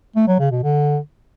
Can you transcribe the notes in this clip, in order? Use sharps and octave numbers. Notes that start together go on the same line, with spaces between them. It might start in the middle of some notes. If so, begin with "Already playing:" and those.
A3
F#3
C#3
B2
D3